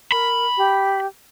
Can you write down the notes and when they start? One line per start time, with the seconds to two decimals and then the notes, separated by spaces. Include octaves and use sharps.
0.12 A#4 B5
0.57 G4